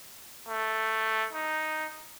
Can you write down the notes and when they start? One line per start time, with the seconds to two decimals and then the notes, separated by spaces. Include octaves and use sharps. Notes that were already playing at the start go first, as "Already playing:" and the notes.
0.48 A3
1.33 D#4